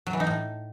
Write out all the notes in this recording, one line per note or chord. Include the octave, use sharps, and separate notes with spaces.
F#3
E3
D#4
A2